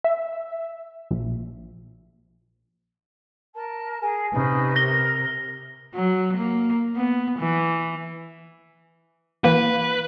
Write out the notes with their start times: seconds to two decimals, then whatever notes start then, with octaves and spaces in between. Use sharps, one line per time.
0.04 E5
1.11 A#1
3.55 A#4 A5
4.00 G#4 A#4 G#5
4.33 C3 C#4 D#4 B4
4.76 A#4 A#6 G7
5.94 F#3
6.37 A#3
6.96 B3
7.38 E3
9.44 E3 A#3 B4